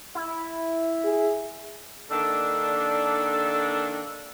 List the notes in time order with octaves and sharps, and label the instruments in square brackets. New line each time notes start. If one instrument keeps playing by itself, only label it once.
[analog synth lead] E4
[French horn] G#4
[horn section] D#3 A#3 D4 [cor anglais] A4